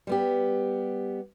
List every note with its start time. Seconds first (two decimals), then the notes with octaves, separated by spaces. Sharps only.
0.07 G3 B3 G4